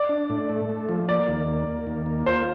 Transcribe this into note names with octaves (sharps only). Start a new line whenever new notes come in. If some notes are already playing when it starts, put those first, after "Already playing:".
Already playing: D5
D4
A2
A3
A3
F3
A#3 D5
D#2
A#3
A#3
D#2
A#3
F4 C5